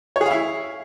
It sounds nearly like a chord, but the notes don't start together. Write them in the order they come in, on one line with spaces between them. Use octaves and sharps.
C#5 G#4 F5 E4